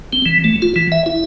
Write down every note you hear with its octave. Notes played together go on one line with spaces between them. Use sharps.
C4
E3
A3
F4
E3
E5
E4